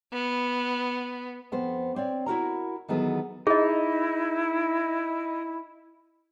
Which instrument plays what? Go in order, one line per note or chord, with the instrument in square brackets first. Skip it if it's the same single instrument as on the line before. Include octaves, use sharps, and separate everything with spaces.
[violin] B3
[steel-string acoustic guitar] F2 B3 C5
C4 C#5 D5
E4 F#4 A#4 A#5
D#3 E3 F#3 B3 G#4 A4
[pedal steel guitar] D#4 [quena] E4 [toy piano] G#4 D#5